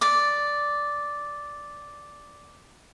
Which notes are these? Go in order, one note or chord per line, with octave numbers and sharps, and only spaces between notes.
D5 D6